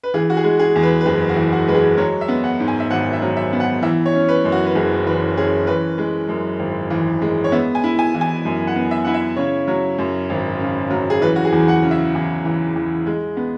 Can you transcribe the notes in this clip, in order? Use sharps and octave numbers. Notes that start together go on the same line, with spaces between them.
B4
E3 G#4
F#4
G#4
G#3
G#4
E2
B4
B4
F#1 G#4
F#4
E3
F#4
G#3 B4
G#4
F#3 C#5
E5
B3
F#5
G#2
G#5
E5
G#1 F#5
E5
F#3
E5
B3
F#5
E3 E5
C#5
C#4
B4
F#2
F#4
B4
F#1 G#4
E3 B4
C#4 G#4
E3 B4
G#3
F#2
G#1
E3
G#3
C#5
B3 E5
G#5
E4
G#5
E3
G#5
F#2
F#5
B3
E5
E4 F#5
E5
C#3 C#5
F#3
F#2
G#1
C#3
F#3
G#4
E3 B4
F#4
G#4
E2
F#5
C#3
E5
E2
E3
E2
G#3
B3